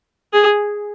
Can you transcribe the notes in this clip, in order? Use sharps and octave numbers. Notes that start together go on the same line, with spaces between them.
G#4